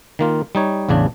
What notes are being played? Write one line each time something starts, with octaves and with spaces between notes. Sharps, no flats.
D#3 A#3 F4
G3 D#4 C#5
A1 E2 C#3 D4